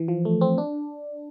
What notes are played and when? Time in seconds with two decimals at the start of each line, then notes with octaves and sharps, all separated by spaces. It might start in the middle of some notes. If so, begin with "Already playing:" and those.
Already playing: E3
0.08 F3
0.25 A3
0.41 C4
0.58 D4